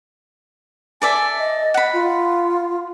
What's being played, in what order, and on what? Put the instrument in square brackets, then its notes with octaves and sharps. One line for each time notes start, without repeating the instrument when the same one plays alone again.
[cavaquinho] A4 D5 E5 [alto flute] G#5
[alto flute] D#5
[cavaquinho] F#5 B5
[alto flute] F4